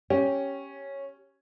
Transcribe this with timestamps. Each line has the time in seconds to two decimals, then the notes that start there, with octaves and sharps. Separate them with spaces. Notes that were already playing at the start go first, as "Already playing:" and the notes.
0.10 C#4 G4 G5